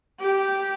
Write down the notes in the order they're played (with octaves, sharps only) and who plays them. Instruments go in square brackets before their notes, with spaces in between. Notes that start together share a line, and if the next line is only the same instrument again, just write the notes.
[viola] G4